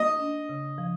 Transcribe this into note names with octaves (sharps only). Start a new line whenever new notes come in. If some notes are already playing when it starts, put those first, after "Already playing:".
Already playing: A#3 D#5
D4
C#3
F3